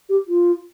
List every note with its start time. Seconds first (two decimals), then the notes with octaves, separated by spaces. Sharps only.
0.09 G4
0.28 F4